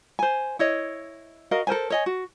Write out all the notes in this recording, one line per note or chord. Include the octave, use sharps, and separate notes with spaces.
C5 G#5
E4 C#5 D#5
F#4 A#4 D#5 F5
A4 A#4 C5 G#5
C#5 D#5 G#5
F#4